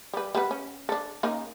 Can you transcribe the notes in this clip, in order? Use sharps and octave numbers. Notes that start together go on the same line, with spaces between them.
G3 B4
G3 B3 B4
C#4
D4 A4
A#3 C#4 D#4